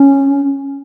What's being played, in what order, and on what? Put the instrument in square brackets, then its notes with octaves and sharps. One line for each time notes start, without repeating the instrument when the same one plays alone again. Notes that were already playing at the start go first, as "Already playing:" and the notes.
Already playing: [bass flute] C#4